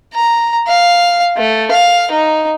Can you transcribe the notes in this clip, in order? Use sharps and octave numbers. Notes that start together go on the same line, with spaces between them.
A#5
F5
A3
F5
D#4